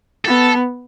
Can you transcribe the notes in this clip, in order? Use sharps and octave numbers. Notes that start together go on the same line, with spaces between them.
B3 A4